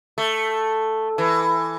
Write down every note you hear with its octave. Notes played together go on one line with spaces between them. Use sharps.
A3
E3